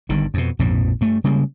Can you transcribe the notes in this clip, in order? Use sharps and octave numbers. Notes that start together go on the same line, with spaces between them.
G1 G2 D#3
F2 B2
A#1 F2 G#2 B2
G2 A3
C#3 G3 G#3 A#3